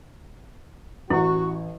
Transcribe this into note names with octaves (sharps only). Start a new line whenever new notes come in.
A1 E4 F#4